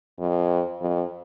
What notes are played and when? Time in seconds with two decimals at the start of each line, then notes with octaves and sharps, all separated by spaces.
0.19 F2
0.81 F2